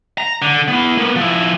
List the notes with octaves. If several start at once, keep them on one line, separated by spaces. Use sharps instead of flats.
A#5
D3
B3 E4
A#3 B3
F3 E4